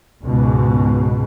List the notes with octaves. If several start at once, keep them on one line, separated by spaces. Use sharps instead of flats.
C#2 G#2 B2